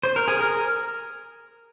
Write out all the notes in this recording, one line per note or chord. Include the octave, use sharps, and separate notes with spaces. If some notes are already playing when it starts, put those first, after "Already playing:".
C5
A#4
G#4
A#4